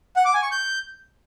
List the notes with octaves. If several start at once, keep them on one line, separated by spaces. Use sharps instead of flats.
F#5
D6
G#5
C#6
G6